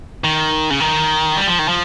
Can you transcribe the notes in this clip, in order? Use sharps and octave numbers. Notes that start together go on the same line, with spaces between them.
D#3
C#3
D#3
G3
F3
D#3
F3